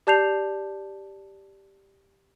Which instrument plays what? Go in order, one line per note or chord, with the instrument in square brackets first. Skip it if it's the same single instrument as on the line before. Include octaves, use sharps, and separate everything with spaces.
[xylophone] G4 D5 A5 G6 C7 F7